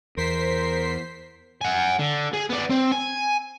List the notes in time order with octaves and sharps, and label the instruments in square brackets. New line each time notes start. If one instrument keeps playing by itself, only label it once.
[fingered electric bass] E2 [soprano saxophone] A#4 [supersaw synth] C5 B6 C7
[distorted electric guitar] F#5 G#5
D3
G#4
B3 D5
C4
G#5